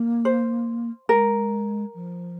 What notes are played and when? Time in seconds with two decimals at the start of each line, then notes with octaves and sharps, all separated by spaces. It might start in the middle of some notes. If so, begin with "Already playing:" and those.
Already playing: A#3
0.25 C5
1.09 G#3 A#4
1.94 F3